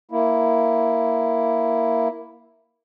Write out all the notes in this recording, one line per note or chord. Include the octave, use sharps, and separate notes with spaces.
A#3 E4